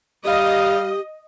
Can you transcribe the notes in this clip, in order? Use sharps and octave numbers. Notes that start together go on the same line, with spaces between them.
G3 G4 D#5 F5